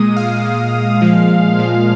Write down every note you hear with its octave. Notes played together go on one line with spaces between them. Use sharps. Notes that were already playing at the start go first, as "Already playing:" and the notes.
Already playing: A#2 G#3 D#6
F5
A#2 G#3
A#2 F3 G#3
A#2 F3 G#3 F5